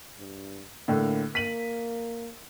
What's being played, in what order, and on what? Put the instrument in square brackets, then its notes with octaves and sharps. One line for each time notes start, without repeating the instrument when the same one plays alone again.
[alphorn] G2
[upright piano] A2 D3 [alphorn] A#3
[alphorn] A#3 [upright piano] B6 D#7 F#7